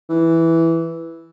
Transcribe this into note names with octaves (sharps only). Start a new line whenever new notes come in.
E3